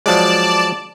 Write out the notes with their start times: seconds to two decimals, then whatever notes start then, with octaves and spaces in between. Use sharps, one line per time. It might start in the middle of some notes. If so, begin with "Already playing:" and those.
0.06 F3 F#3 G#3 D5 A5